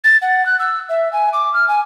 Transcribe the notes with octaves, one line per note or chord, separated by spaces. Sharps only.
A6
F#5
F#6
E6
E5
G#5
D6
F6
G#5